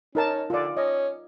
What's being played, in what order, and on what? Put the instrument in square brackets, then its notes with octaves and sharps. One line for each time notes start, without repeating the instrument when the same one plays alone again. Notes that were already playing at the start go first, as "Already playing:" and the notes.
[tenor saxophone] C#4 [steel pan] D#4 A#4 A5
[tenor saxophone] D3 [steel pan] F4 D5
[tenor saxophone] C#4 [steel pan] D#5